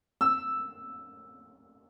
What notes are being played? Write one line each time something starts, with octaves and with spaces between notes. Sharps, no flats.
E6